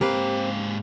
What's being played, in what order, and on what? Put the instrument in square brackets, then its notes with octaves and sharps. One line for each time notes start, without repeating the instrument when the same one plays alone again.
[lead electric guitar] G#2 F5 [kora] A#3 B4 [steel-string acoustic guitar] C4 G4